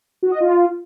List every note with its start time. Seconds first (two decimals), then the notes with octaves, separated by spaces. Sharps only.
0.23 F#4
0.31 D#5
0.40 F4